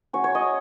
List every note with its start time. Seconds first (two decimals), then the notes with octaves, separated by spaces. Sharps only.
0.13 F#3 C#4 C#5
0.24 C#5
0.35 D#5